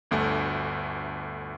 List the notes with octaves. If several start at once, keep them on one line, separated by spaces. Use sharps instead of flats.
G1 D2 A3